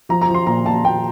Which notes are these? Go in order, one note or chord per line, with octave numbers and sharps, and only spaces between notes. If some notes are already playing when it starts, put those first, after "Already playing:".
F3 A#5
A#5
F3
C6
A#2 A#5
A#2 A5
A#2 G5